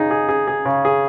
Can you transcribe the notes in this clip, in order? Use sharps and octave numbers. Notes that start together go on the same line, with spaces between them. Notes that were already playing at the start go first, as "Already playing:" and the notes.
Already playing: C#3 D#4 G#4
G#4
G#4
G#4
C#3
G#4